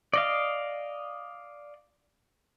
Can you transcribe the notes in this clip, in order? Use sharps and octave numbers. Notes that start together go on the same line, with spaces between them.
D5 D#5 F5